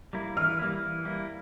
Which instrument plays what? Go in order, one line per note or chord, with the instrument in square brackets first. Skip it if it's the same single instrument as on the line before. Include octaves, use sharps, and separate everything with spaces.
[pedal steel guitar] G3 A#3 E4
[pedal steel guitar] E3 [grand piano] F6
[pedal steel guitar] G3 A#3 E4
E3
G3 A#3 E4